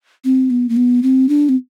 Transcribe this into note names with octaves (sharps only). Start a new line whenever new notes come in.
C4
B3
A#3
B3
C4
D4
C4